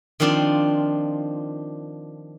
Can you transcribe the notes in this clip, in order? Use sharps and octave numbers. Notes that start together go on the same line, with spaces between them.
D#3 F3 C4 D4 F4